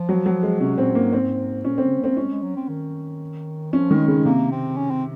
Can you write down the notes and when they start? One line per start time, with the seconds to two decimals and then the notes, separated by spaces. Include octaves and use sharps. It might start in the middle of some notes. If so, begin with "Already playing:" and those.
Already playing: F3
0.09 F#3
0.26 F#3
0.43 G#3
0.60 C3 C#4
0.78 A#2 C4
0.95 G#2 A#3
1.13 C4
1.65 A#2 C#4
1.78 C#3 C4
1.99 A#3 C4
2.17 G#3 C#4
2.29 G#3
2.42 F#3
2.56 C4
2.69 D#3
3.73 F3 C#4
3.91 D#3 G#3
4.08 C#3 G#3
4.25 C3 A#3
4.51 C4
4.77 C#4
4.90 C4